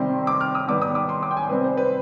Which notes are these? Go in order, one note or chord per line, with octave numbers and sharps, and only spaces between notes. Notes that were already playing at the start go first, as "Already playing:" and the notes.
Already playing: C3 D#3 G3 C4 C6
D6
F6
D#6
D#3 G3 B3 D6
D#6
D6
C6
D6
G5
G#5
C3 G3 C4 B4
C5
B4